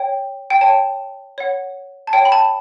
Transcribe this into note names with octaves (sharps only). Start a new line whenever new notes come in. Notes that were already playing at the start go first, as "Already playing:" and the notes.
Already playing: C#5 G5
G5
C#5 G5 A5
C#5 F#5
A5
C#5 F#5 G5
B5
A5